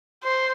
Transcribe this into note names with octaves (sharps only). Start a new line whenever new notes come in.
C5